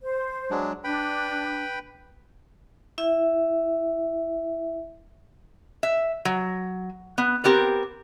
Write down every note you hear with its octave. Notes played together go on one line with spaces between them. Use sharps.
C5
F#3 G#3 D4
D4 B4 G5 B5
E4 E5
E5
F#3
B3
B3 C4 G4 A#4